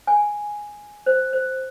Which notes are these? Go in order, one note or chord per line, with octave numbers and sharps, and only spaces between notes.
G#5
C5
C5